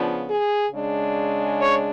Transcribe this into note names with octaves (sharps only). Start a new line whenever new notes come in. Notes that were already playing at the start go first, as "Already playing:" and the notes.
Already playing: C#3 F3 B3 D4
G#4
C#3 G#3 D4
C#5